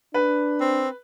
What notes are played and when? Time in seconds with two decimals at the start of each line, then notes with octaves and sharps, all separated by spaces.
0.14 D4 B4
0.61 C4